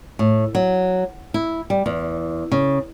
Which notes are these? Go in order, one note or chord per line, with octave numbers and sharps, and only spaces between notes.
A2
F#3
E4
G3
E2
C#3